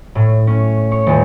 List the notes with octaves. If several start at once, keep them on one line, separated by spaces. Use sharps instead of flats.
A2
C#4
C#5
D#1